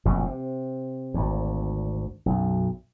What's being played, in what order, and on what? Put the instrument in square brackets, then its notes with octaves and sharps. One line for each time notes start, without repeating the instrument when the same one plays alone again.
[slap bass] F1 A#1 F#2 B2
C3
G#1 D2
B1 F#2